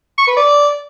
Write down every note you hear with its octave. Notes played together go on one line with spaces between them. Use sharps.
C#6
B4
D5